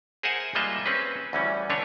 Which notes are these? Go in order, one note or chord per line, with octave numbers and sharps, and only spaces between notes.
G#4 A#4 C5 E5 F#5 G#5
G3 G#3 A#3 F4 D#5 E5
C4 C#4 G#4 B4
D2 E3 G3 C#4
D3 A3 D4 B4 C#5